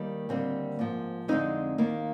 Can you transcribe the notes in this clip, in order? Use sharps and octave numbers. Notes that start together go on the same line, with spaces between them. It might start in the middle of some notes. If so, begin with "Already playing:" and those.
Already playing: D#2 D#3 G3 A#3
D#2 D3 G3 A#3 C4
G#2 F3 A#3
F2 D3 G#3 C4 D#4
D#2 D#3 A#3